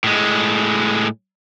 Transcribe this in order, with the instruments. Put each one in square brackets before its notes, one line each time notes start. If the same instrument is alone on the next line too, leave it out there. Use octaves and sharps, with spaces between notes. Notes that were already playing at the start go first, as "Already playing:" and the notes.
[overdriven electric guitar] A2 G#3